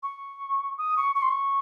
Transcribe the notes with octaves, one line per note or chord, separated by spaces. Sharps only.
C#6
D#6
C#6
C#6
C6
C#6